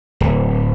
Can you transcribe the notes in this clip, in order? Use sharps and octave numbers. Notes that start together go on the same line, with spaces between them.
D1